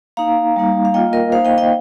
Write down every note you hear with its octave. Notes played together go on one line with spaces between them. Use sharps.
A#3 D#4 F5 A#5
G3 A#3 D#4
F5
A#3 F4 D#5 G5
A#4 D#5
A#3 D#4 C5 F5
D#5 G5
D#5 G5